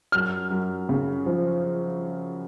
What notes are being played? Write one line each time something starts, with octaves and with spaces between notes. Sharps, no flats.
F#2 F6
F#2
C#3
F3